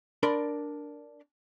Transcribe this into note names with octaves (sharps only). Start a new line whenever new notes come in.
D4 A#4 D5 B5 C6